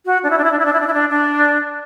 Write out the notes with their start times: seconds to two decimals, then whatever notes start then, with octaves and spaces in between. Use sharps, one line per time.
0.05 F#4
0.23 D4
0.30 E4
0.38 D4
0.44 E4
0.52 D4
0.59 E4
0.65 D4
0.73 E4
0.80 D4
0.87 E4
0.93 D4
1.10 D4